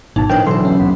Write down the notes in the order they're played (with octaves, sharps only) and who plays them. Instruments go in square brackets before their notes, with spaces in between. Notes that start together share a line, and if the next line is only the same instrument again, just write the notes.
[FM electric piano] G#1 B2 A5 [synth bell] D#4
[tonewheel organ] A2 D#3 F3 [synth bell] D4 B4 C#5 [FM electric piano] G5
[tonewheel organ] B2 D3 E3 [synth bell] F#3 B4 [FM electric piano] A4 C6
[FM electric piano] C#4
[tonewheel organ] E2 C3 B3